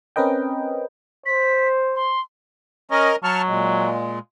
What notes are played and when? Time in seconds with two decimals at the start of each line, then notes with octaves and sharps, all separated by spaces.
0.16 C4 C#4 A#4 B4 D#5 G5
1.26 C5 B6
1.95 C6
2.91 C#4 A#4 D#5
3.24 F#3 A5 C#6 F6
3.47 A#2 G#3